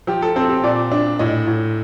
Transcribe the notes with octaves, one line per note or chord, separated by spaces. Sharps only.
F3 G4
A4
C4 A4
G4
A#2 D5
D4
A2 D#5
A2